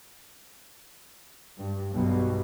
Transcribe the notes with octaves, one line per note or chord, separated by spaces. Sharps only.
G2
B1 G2 B2